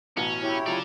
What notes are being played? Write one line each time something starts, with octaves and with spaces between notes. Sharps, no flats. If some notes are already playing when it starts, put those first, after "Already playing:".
A1 B2 C#4
E4 G4 C#5
C#3 F#3 F4 A4 D5